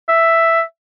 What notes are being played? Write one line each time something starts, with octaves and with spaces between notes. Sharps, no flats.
E5